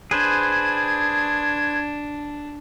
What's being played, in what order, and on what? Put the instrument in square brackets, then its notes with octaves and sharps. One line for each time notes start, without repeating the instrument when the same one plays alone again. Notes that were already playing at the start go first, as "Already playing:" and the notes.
[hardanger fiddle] D4 [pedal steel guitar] G#4 B4 C5 [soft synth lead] G#6